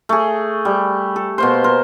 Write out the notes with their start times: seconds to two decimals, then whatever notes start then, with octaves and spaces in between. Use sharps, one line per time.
0.09 A3 G#4
0.65 G3
1.16 A4
1.38 B2 A#3 C5
1.64 A#4 C5